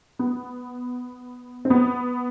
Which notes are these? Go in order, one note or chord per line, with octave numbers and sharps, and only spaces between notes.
B3
C4
B3